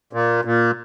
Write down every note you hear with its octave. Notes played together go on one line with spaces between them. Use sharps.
A#2
A#2